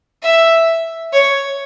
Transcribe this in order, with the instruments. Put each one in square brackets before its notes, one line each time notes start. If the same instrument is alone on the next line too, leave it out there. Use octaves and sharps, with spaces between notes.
[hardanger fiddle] E5
C#5